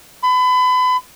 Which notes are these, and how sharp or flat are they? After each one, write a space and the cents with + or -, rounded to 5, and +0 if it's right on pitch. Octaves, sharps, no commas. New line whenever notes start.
B5 +35